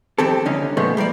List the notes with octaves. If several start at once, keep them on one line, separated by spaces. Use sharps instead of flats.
F2 D#3 C4 G4 A4
C2 D3 C#4 D#4
A#2 F3 G#3 A3 B3
G3 A#3 A#4 D5